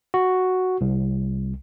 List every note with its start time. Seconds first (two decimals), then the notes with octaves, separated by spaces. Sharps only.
0.14 F#4
0.81 C2